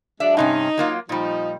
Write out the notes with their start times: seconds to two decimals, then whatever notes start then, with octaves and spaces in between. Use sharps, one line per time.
0.20 F#3 G#3 D4 E5
0.37 G2 C3 C#4 D#4
0.78 F#3 A#3 F4
1.09 A#2 F3 G3 D#4